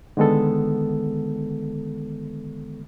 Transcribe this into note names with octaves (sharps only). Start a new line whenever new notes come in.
D3 D#3 G#3 B3 A4